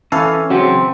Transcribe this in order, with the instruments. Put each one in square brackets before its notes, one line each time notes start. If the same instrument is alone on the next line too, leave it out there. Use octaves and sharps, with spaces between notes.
[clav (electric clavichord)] E3 F5 [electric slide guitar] C#4 [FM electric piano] A4
[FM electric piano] C#3 F#3 [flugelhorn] C4 [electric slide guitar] C5 F#5